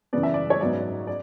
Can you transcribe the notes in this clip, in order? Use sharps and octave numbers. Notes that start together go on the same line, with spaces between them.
F#2 C#3 E3 B3 D5
E5
D5
C#5
G#2 F#3 B3 D5
D5